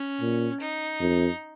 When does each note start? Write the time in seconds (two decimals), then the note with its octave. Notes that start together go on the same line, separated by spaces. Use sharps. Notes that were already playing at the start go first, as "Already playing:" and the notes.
Already playing: C#4
0.21 A#2
0.60 D#4
1.00 F2